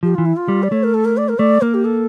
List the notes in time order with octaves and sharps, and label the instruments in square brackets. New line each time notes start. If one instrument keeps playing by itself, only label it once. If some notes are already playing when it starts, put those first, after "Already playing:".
[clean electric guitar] F3 [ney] G4
[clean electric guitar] E3 [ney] F4
[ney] E4
F4
[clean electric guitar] G3
[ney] D5
[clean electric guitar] A3 [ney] C#5
[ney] A#4
A4
A#4
D5
A#4
[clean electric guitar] A3 [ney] D5
[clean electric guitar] A#3 [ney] A#4
[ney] G4
A4